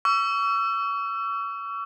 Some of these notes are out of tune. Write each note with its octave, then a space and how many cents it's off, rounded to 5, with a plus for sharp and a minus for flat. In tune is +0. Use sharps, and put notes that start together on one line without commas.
C#6 +35 E6 +35